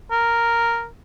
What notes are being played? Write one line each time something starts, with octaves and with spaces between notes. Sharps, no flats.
A#4